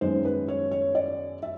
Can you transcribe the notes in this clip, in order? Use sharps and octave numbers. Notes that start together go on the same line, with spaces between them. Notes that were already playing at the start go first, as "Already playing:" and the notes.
F#2 D#3 G#3 B3 C5
B4
C#5
C#5
D5
E5